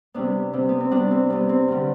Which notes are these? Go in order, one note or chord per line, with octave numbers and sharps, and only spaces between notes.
C3 G3 B3 D4
C3 G3
B3
C4
C3 G3 B3 D4
C4
C3 G3 B3
C4
G2 D3 G3